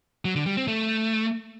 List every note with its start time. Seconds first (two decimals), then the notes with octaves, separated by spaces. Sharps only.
0.25 F#3
0.36 D3
0.46 G3
0.57 C4
0.68 A3